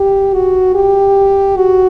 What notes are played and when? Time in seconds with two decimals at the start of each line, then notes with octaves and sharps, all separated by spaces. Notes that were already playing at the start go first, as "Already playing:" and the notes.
Already playing: G4
0.34 F#4
0.75 G4
1.57 F#4